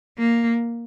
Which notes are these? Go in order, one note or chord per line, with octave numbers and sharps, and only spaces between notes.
A#3